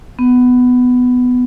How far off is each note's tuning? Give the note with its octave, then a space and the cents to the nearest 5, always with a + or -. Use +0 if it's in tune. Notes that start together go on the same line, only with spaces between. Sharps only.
B3 +10